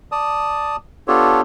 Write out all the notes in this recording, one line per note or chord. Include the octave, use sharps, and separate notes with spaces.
D5 A5 D#6
B3 D4 F4 G4 A4 C#5